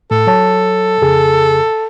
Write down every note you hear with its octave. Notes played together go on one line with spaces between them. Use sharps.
A2 A4
F#3 C#5 A5
F2 C#3 G#4